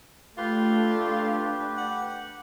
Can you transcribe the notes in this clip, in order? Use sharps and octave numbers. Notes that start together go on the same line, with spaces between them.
A3 D4 F4 G4 B4
F#5